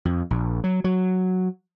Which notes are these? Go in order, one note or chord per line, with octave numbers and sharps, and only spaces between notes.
F2
A#1
F#3
F#3